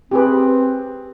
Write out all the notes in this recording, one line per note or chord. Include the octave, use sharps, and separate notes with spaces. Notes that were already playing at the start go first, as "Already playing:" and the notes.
C4 G4 G#4 B4